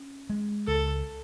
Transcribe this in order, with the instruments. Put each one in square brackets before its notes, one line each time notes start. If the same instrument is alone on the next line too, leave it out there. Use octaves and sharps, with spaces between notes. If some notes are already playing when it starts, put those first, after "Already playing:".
Already playing: [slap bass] C#4
G#3
[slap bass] C#2 [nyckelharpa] A4